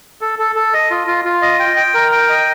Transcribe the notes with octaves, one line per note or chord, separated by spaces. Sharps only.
A4
A4
A4
D#5
F4
F4
F4
D#5
G5
G5
A#4
G5
D#5